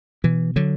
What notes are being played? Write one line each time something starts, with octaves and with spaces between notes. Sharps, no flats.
B2 E3
D3 F#3